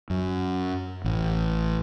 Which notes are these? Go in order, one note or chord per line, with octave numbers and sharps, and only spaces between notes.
F#2
A1